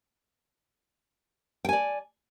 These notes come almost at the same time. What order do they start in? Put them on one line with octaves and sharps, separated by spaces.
G5 G#5 D5